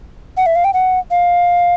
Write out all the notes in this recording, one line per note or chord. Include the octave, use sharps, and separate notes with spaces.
F#5
E5
F5
G5
F#5
F5